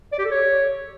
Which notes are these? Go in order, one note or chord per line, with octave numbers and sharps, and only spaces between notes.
D5
G4
A4
C#5